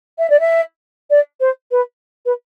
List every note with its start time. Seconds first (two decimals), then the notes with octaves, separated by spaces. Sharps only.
0.19 E5
0.30 D5
0.40 E5
1.10 D5
1.40 C5
1.71 B4
2.26 B4